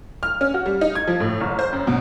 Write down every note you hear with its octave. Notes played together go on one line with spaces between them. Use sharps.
F6
C#4
F#4
G3
D#4
G#6
F3
A2
F#1
C5
F#2
B2